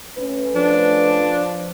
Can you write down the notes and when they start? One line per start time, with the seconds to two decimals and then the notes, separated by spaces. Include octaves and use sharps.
0.18 A3 C#4 B4
0.55 F3 D4